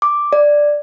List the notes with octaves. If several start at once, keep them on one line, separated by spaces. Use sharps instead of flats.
D6
D5